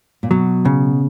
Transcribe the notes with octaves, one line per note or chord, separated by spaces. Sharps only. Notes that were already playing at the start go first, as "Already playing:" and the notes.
A#2
B2 F#3
C#3